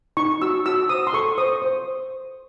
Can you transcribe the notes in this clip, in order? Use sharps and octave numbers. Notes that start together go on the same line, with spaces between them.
D#4 C#6
F#4 E6
F#4 E6
C5 D#6
C6
A4 C#6
C5 D#6
C5